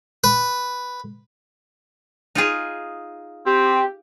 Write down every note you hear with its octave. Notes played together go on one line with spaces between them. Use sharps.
B4
D#4 F4 G#4
C4 G4